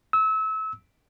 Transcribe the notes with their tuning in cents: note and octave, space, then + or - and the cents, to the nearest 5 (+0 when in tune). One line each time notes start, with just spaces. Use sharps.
E6 -30